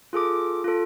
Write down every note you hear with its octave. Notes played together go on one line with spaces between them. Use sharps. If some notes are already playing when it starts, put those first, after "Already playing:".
F4 G#4 A4 D6
F4 A4